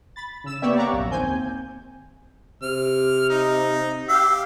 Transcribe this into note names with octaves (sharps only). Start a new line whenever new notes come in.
B5 A6
C#3 E6 E7
A#3 B3 G4 C#5 D5 E5
D5 F5 F#5 A#5 C#6 D6
A#1 F#2 A#3
D#2 C4 G#5 G6
C3 F6
D#4
G4 F5 E6